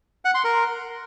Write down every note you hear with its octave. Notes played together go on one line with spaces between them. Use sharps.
F#5
C6
A#4